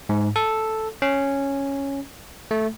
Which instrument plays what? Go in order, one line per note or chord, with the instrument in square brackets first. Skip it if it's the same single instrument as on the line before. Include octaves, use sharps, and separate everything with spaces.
[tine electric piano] G#2
A4
C#4
A3